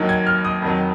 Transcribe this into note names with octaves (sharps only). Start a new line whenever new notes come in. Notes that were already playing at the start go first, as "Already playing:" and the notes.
Already playing: D#2 D#3 F#3
G#6
F6
D#6
F2 D#3 F#3